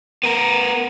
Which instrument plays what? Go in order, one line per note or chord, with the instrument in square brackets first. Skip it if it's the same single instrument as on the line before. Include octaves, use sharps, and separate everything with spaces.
[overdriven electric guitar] B3 A#4